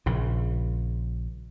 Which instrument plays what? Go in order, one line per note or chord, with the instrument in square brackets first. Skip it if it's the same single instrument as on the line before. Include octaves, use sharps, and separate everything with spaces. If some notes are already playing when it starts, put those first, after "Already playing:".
[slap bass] A#1 C#3